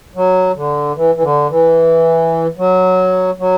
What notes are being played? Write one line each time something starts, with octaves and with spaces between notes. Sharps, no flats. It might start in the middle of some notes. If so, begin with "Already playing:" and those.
F#3
D3
E3
E3
D3
E3
F#3
F#3